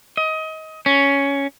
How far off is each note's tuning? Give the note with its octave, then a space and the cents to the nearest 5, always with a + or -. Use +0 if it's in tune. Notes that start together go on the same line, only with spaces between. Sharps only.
D#5 +25
C#4 +10